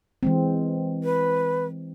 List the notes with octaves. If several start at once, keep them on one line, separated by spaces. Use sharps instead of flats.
E3 G#3 C4
B4